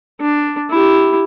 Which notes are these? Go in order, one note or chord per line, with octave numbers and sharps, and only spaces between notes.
D4
E4 G4